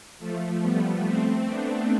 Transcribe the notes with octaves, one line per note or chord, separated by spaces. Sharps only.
F3 A3
G3 B3
A3 C4
B3 D4